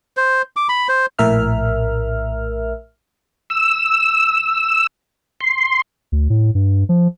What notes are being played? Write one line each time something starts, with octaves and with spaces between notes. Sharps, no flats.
C5
D6
B5
C5
A#1 A2 A#4 E5 F6
E6
C6
D2
A2
G2
F3